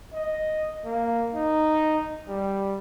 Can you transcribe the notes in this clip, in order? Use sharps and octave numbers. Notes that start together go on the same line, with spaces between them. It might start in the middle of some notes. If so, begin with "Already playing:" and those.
D#5
A#3
D#4
G3